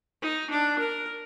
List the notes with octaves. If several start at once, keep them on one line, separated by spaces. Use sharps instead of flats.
D#4
D4
A#4